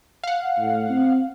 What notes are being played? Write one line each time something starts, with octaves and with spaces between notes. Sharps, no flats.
F5 F#5
A2
C4